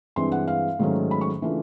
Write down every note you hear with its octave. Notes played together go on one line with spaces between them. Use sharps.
G2 E3 G#3 C4 C6
F#5
F5
G#2 D#3 F#3 A3 C#4
B5
C#6
C#3 E3 A3 D4 F4